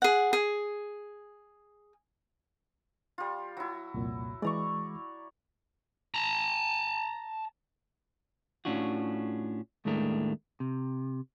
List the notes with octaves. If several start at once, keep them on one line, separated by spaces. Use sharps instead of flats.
G#4 F#5
G#4
G3 F4
F#3 E4
C2 F2 A#2
E3 G#3 D5 A#5 C#6
A5 A#5
A2 C#4 D4 F4 F#4
D#2 A2 G#3 A3 D4 A#4
C3